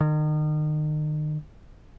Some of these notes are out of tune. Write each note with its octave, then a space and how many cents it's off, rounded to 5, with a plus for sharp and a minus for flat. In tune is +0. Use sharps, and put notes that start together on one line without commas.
D#3 -35